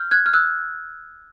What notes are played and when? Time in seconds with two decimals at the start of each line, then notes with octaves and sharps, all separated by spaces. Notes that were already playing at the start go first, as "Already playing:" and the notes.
Already playing: F6 G6
0.11 F#6 G#6
0.26 F6
0.33 E6 F#6